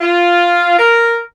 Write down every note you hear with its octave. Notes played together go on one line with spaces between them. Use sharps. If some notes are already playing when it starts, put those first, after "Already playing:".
F4
A#4